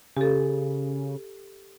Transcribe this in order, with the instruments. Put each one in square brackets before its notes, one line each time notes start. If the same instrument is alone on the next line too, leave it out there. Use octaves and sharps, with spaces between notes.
[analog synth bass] C#3 [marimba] G4 A4